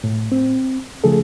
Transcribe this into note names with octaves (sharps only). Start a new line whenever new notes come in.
A2
C4
C#3 F3 A3 G#4 A4